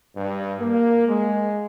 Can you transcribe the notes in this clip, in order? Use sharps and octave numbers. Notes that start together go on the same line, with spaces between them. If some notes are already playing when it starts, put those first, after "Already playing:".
G2
A#3
G#3